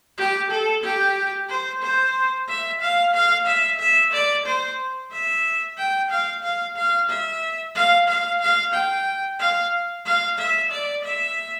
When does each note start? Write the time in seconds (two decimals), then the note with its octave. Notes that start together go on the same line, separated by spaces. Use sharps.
0.18 G4
0.51 A4
0.84 G4
1.49 C5
1.82 C5
2.48 E5
2.81 F5
3.14 F5
3.47 E5
3.80 E5
4.13 D5
4.46 C5
5.12 E5
5.78 G5
6.10 F5
6.44 F5
6.76 F5
7.10 E5
7.75 F5
8.08 F5
8.41 F5
8.74 G5
9.40 F5
10.06 F5
10.38 E5
10.71 D5
11.04 E5